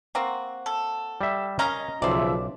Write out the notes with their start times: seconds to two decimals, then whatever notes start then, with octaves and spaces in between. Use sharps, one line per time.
0.15 A#3 C4 F#4
0.66 A4
1.21 G3 E5
1.59 C#4 A#4 D#5 F5 A#5
2.02 B1 C#3 F3 C5 D5 E5